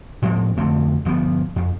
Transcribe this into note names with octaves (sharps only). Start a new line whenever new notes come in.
A2 F3 G#3 C4
F2 D3 A3 C4
G1 F3 G3 B3
F2